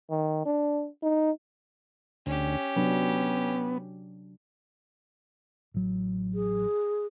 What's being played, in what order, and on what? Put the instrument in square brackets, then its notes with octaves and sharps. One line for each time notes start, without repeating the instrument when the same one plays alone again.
[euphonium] D#3
D4
D#4
[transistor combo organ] D2 [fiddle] C#4 G4
[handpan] C3 F#3 D4 [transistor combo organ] B3
[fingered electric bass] A1 F#3
[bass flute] G#4